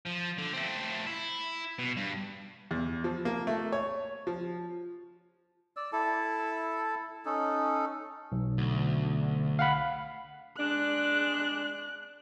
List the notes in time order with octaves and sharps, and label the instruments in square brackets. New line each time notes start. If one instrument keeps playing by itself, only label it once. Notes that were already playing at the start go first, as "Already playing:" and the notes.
[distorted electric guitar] F3
D3
A3 C4
E4
B2
G2
[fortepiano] E2
F3
A#3
A3
C#5
F3
[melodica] D5 E6
E4 A4 A5
C#4 D#4 A4
[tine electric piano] B1
[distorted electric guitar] D2
[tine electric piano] F5 F#5 B5
[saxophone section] G#3 D4 [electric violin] F#6